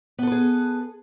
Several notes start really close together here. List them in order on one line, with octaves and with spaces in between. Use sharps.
B3 A4 B4 G#4